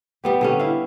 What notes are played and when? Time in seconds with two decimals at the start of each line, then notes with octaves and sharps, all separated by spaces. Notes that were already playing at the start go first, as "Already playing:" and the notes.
0.24 G3 B3 G4
0.41 D3 G3 C#4
0.59 E4 F5